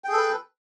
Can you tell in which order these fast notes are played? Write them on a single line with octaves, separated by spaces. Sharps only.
G5 G#4 A4 B4